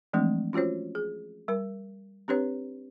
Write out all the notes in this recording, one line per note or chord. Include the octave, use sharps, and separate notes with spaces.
E3 F3 G#3 A3 C4 D4
C#4 F4 F#4 C5 C#5
G#4
G3 A#4
C4 D4 G4 B4 C#5